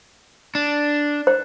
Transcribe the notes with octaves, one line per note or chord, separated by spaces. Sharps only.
D4
C5